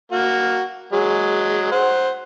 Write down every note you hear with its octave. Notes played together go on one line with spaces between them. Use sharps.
A#3 F#4
F#3 G#3
C5 F#5